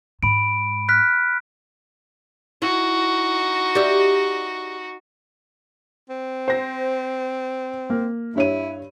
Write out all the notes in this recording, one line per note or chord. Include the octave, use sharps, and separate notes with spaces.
G#2 B5 D7
F6 F#6 B6
D#4 E4 F#4
G4 D5 E5
C4
C5 A#6
A#3
G2 E4 C#5 D#7